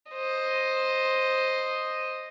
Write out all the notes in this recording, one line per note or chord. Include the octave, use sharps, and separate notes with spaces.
C5 D#5